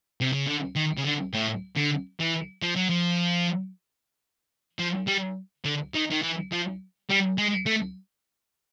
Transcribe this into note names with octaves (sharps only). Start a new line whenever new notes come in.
C3
C#3
D3
D#3
C#3
D3
A2
D3
E3
F3
F#3
F3
F3
G3
D3
D#3
D#3
E3
F3
G3
G#3
A3